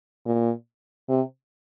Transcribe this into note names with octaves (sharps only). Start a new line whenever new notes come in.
A#2
C3